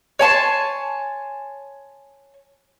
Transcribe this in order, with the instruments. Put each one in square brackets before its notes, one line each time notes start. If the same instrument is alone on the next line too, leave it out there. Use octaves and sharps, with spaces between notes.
[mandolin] C#5 G#5 A5 C6